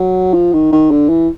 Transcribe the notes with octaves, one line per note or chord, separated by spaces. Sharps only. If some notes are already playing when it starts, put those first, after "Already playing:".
Already playing: F#3
F3
D#3
D#3
D3
E3